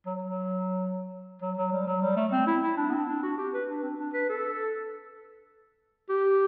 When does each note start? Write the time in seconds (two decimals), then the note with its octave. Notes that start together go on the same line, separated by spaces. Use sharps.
0.06 F#3
0.22 F#3
1.42 F#3
1.57 F#3
1.72 G3
1.87 F#3
2.02 G3
2.17 A3
2.32 C4
2.47 E4
2.63 E4
2.77 D4
2.89 B3
2.92 C4
3.08 D4
3.23 F#4
3.38 G4
3.54 B4
3.69 D4
3.83 C4
3.99 D4
4.14 B4
4.29 A4
6.10 G4